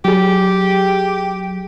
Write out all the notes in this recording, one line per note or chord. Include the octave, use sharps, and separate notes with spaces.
F#3 G4 G#4